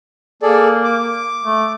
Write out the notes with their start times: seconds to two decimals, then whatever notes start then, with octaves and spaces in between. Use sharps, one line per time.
0.43 A#3 G#4 A4 D5
0.84 D6
1.44 A3